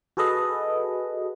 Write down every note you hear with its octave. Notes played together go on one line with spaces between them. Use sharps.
F#4 G#4 A4 B4 D#5